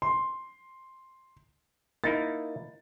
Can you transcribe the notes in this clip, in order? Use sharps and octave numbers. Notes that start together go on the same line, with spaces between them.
C6
A#3 D#4 E4 A6